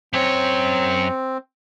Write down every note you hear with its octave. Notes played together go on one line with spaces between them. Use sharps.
F#2 C4 C#5